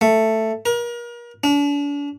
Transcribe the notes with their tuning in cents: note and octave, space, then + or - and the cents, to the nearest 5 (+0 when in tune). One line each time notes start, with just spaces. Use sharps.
A3 +5
A#4 +35
D4 -40